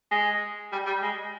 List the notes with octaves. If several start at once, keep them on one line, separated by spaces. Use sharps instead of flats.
G#3
G3
G3
G#3